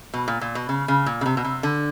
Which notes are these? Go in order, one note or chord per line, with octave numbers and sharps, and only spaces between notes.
B2
A#2
A#2
B2
C#3
C#3
A#2
C#3
C3
B2
C3
D3